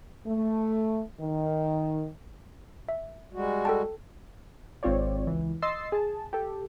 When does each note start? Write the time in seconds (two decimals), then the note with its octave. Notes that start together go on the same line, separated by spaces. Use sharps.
0.27 A3
1.20 D#3
2.89 E5
3.33 G3 G#3 F#4
3.65 A4 G5 A5
4.83 G#1 C4 F4 C#5 D5
5.27 C#2 E3
5.62 D#5 C6 E6 A6 C7
5.92 G#4 A5
6.33 G4 A4